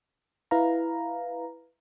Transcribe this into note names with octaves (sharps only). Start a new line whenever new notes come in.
E4 B4 F5 A#5